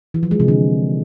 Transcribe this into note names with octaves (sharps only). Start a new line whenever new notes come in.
E3
F3
G#3
C3
D3